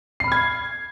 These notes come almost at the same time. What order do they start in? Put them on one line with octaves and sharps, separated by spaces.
C7 B5 F6 G#6